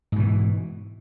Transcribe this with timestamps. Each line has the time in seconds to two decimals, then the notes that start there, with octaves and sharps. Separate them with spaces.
0.12 G#2
0.16 B2
0.20 E3